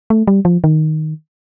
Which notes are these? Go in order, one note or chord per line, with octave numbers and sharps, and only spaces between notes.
A3
G3
F3
D#3